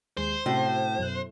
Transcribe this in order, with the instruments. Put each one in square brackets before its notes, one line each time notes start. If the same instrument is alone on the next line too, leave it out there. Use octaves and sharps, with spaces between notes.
[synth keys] D#2 G#3 C7 [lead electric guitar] C5
[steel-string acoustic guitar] A2 [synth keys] C3 C#4 F#4
[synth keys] F#2 B2 F#6